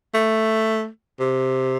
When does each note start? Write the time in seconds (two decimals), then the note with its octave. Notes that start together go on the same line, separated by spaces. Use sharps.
0.14 A3
1.20 C3